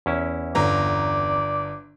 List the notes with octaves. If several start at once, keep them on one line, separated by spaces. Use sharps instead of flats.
E2 C#4 E4
G1 D5 A#5